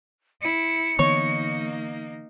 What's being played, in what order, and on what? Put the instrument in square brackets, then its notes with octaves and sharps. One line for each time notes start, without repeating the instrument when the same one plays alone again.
[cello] E4 [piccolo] C#7
[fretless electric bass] D3 E3 B3 [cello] A#3 D#4 [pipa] C#5